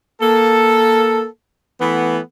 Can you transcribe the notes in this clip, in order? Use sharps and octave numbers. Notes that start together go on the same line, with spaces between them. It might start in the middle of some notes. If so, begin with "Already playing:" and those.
A#3 A4
E3 A3 B3